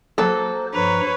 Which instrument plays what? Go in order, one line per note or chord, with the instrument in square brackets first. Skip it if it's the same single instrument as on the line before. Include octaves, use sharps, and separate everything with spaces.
[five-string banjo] F#3 A#3 [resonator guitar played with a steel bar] A4 [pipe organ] C5
[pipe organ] G2 F3 A#5 [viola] B4 C#5